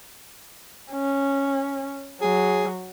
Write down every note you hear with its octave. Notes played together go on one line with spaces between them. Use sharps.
C#4
F#3 G#4